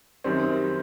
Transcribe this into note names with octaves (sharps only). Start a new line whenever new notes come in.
F#2 D#3 G3 C4